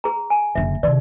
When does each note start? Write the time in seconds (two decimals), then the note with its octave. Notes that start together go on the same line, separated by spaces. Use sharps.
0.04 G#4 A#5
0.30 G#5
0.55 F#1 D3 E5
0.83 C3 D#3 D5